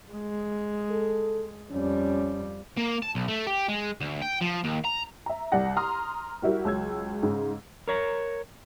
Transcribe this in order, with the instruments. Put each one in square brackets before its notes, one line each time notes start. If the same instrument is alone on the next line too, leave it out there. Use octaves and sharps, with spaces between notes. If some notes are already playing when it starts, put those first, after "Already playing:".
[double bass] G#3
[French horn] A4
[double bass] F2 G3 [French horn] C#4
[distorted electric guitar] A#3
A5
B1
A3
G4
G#3
D2
G5
F3
D#2
A#5
[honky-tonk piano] E5 A#5
C2 D5 F#5 A#6
A#5 C6 D#6 F6
G3 E4 F#4 A#4
C#2 F#3 E6 G#6
G#2 C#3
[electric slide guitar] A#4 C#5 A#5